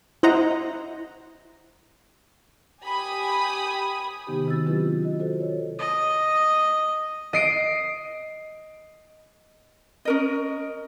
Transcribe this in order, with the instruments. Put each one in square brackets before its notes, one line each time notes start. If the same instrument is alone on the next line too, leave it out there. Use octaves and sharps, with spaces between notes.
[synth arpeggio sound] E4 C5 D#5 F#5 A#5
[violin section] G4 G#5 B5 D#6
[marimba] C3 D#3 B3 D#4 G4
C3 D#3 C4 F#4 E6 A6
F#3 C#4 E4 F4 G4 B4
F#4 D#5
F4 F#4 A4 C5 D#5
C#5
[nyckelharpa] D#5
[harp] D#5 C7 D7
[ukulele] C#4 A#4 D#5